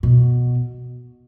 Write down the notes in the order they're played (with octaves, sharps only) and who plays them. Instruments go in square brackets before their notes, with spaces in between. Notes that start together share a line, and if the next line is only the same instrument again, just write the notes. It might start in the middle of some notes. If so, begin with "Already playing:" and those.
[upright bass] B2